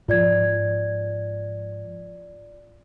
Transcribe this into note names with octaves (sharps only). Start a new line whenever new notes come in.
G#2 F3 F4 D5 G#6